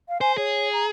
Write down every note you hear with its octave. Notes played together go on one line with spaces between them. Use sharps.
F5
C5 G#5
G#4 C#5
A#5